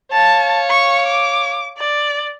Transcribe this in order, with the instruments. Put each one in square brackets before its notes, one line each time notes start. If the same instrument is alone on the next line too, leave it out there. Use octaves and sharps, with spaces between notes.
[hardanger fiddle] C#5 F5 [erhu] A5
[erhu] C#6
D6
D5